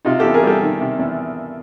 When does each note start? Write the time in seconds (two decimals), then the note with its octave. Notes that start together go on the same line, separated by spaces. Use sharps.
0.05 C3 D#4 F4
0.19 E2 G4 A4
0.34 G#4 A#4
0.43 G3 G4 A4
0.62 D#3
0.80 C3
0.99 E2